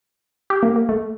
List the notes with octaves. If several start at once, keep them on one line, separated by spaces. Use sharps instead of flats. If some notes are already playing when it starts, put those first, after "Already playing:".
G4
A#3
A#3
A3